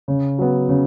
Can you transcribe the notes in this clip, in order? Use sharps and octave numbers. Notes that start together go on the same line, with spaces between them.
C#3
F#3 B3
C#3